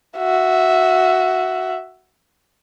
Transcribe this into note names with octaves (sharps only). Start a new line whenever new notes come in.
F#4 E5